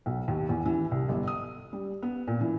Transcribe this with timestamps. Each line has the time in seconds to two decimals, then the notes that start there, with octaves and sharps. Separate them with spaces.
0.06 B1
0.28 D#2
0.49 E2
0.66 E3
0.91 C2
1.09 G1
1.27 D#6
1.73 G3
2.03 B3
2.27 A#2
2.41 E3